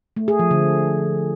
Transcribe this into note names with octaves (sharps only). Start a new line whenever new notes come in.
A3
G#4
F3
D3